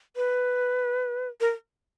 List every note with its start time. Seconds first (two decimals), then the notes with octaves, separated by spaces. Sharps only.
0.16 B4
1.41 A#4